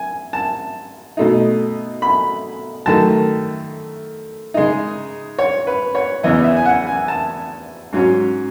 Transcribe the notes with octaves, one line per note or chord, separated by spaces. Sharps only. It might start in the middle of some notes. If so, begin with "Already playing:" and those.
Already playing: G#5
A5
B2 A3 D#4
B5
F#2 D#3 A3 A5
C#3 G#3 D#4
C#5
B4
C#5
E2 C#3 E3 B3 D#5
E5
G#5
F#5
G#5
A5
G#2 F#3 C#4